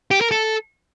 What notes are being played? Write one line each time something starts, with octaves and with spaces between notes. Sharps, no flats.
G4
A#4
A4